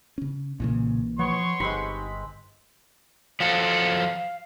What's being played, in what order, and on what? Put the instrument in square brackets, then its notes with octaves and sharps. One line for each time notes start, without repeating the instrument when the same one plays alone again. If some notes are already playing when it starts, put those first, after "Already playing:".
[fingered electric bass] C#3 C#4
[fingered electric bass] B1 E3 A#3 [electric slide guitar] A#2 C#3
[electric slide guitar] F3 [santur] B3 [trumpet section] C#5 C6 C#6
[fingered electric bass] G1 [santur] G#3 C4 B5 [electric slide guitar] D#4 G4 F#5
[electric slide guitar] F3 F#3 A4 [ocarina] F5